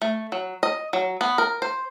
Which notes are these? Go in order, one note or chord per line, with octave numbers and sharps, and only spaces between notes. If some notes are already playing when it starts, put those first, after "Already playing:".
A3
F#3
D#5
F#3
B3
A#4
C5